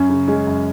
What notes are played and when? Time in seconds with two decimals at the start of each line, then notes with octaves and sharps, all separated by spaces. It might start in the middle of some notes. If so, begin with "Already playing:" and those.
Already playing: F#2 C#4
0.10 C#3
0.28 G#3 C#4
0.47 F#2